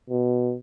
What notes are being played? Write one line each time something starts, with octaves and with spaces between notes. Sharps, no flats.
B2